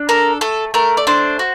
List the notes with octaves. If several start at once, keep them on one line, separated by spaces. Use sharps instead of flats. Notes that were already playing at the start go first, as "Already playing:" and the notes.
Already playing: D4
A4 A#4
A3 A4
A3 A#4
D5
D4 C5
F#4